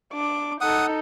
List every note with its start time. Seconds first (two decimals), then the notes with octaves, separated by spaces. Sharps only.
0.13 D4 D6
0.61 D#4 A4 F#5 D#6